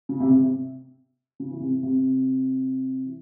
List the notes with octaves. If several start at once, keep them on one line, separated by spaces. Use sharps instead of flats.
C#3
C3
C3
C3
C#3
E3
C3
C3
E3